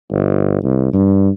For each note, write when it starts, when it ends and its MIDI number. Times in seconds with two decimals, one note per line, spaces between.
0.12 0.60 31
0.64 0.89 36
0.93 1.29 43